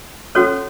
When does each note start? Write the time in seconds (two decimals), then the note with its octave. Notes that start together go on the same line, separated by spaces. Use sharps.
0.35 C#4 F#4 A4 C#5